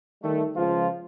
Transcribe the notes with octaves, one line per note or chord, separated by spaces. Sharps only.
D#3 G3 A3
C#2 F3 F4